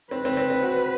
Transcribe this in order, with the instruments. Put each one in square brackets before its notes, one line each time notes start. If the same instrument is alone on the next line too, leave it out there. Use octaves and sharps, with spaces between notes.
[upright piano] C4 [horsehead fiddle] B4
[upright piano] C4
C4
C4
F#4